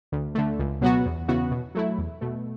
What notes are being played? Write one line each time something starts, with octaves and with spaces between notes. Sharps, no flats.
D2
D3 A3
C#2
B2 F#3 B3 F#4
E2
C#3 E3 B3 F#4
B2
F#3 A3 E4
E2
B2 A3